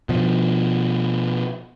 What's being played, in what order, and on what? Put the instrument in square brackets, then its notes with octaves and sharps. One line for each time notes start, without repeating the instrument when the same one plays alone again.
[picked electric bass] B2 F3